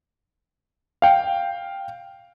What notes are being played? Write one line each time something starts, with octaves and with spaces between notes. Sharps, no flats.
F5 G5